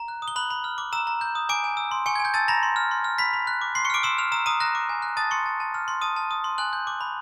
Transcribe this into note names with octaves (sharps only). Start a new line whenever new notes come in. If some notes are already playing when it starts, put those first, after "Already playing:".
Already playing: A#5
F#6
D#6
G7
B5 F#6 F#7
B5
F6
D6
A#5 E6 E7
A#5
G6
D#6
G#5 D6 D7
G#5
E6
C6
G#5 C#6 C#7
G#6
G#5
G6
A5 E6 A6
A#5 B5 A#6
C6
F6
C6
F6
B5 B6
B5
F#6
D6
C6 C7
C#6 C#7
D6 F6 D7
C6 E6 E7
F6 F7
A#5 E6 E7
A#5 D#6 D#7
A#5 F#6 A#6
D6
G#5
F#6
A5 D#6 A6
C6 C#6 C#7
A5
A5
F6
C6
A5 D#6 D#7
A5
D#6
C6
G#5 F#6 F#7
G6
D6
B5